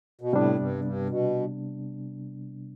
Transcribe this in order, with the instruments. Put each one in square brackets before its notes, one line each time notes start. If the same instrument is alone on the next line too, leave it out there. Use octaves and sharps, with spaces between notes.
[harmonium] B2
[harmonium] A2 [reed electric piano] C3 G3 B3 D4
[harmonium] G2
G2
B2